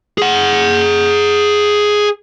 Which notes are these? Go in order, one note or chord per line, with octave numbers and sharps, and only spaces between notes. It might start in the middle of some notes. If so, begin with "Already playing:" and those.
G#4 F#5